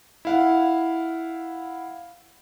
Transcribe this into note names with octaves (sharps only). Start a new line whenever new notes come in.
E4 F5 F#5